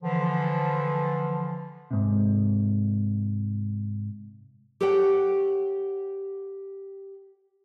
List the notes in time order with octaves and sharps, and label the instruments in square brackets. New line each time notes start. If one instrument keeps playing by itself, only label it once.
[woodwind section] D3 E3 F3
[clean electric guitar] G#2 C3
[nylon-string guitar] G4 A4 C#5 F#5 G5